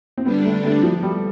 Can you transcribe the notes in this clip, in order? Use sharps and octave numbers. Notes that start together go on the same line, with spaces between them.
C4
D3 G3 B3 D4
A3
A3
F3
G3